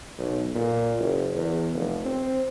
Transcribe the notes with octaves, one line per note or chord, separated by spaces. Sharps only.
B1
A#2
F#1
E2
F1
C4